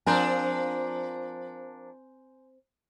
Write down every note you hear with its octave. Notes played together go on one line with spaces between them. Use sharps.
F3 C4 D4 A#4 G#5 C6 G6